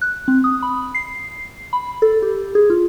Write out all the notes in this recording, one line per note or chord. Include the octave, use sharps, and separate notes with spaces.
F#6
C4
D#6
B5
C7
B5
A4
G4
G#4
F4